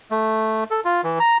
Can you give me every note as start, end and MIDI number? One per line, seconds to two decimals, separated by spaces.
0.11 0.64 57
0.71 0.80 69
0.85 1.01 65
1.04 1.19 52
1.20 1.37 82